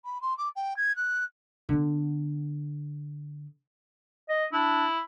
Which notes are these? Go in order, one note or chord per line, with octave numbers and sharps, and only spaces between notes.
B5
C6
D6
G5
G#6
F#6
D3 B3
D#5
D4 E4